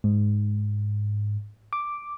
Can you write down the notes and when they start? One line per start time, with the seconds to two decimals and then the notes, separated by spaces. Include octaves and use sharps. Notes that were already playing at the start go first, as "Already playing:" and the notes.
0.04 G#2
1.73 D6